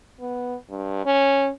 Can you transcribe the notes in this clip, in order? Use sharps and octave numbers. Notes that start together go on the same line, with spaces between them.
B3
G2
C#4